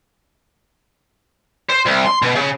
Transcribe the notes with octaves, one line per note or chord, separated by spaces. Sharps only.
C5
C2
C6
B2
C#3